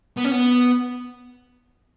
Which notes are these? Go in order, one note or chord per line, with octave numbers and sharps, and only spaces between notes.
B3
C#4
B3